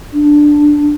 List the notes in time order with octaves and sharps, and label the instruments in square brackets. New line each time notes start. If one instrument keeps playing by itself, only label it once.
[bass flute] D4